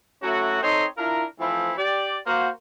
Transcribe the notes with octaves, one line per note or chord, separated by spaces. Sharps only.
F#3 A3 C#4 E4 F#4
C4 D#4 A4 C#5 D#5 C6
D4 E4 F4 A#4
E3 F3 A3 C4 E4
G4 D5
A#3 F#4 C5